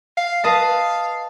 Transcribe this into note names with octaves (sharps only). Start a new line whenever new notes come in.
F5
B4 D#5 F5 A5